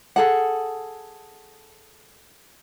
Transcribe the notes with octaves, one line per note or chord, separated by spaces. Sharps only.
G#4 A4 F#5